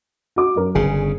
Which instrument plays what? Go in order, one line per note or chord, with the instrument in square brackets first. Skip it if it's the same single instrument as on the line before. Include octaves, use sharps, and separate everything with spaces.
[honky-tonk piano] F#4 D6
F#2 A#4
[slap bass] G1 C#3 [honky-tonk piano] G#4